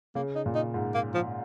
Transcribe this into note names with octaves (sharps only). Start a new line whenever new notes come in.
C#3 A#3
D#4
A#2
D#4
G#2
A#3
F3